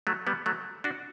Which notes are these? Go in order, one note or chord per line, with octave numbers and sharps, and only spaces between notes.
F#3 A3
G3 B3
F#3 A3
D4 F#4